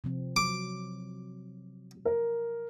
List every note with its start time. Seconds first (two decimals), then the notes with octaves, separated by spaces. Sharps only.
0.04 C3 F3 C4
0.36 F#3 D6
2.05 A#4